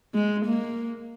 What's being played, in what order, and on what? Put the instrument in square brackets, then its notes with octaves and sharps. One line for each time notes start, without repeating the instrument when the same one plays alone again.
[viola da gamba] G#3
A#3